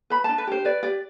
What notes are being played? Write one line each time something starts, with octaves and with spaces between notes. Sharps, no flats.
B4 B5
D4 A5
B4
G4 C5
B4 D5
G4 D5